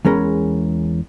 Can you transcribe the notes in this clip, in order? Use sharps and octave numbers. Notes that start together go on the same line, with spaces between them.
E2 G#3 C#4 A#4 B5